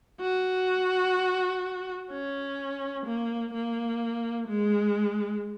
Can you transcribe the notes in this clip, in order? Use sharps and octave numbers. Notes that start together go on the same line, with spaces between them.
F#4
C#4
A#3
A#3
G#3